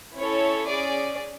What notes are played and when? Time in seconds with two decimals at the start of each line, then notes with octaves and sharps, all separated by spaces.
0.16 C#4 E4 A4 C#5
0.66 C#4 G#4 D5